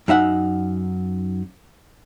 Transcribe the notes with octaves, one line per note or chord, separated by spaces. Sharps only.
F#2 D#4 E5 F#5